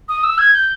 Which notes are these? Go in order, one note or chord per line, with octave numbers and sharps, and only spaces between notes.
D#6
E6
G#6
G6